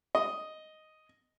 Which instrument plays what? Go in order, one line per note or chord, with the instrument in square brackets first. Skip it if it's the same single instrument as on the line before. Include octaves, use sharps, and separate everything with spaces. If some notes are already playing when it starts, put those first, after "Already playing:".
[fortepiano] D#5